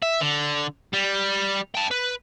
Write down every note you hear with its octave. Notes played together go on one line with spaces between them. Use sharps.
E5
D3
G3
G5 A5
B4